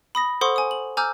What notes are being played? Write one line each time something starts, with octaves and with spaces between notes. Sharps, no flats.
B5 D#6 A#6
A4 C5 F#5 C6 C#6 D#6
G#5 D#6
F#7
G#5 A#5 D6 E6 F6 G6